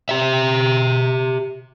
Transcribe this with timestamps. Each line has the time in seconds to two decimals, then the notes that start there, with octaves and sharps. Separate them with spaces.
0.09 G4 E5